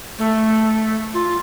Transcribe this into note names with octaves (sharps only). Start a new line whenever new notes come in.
A3
F4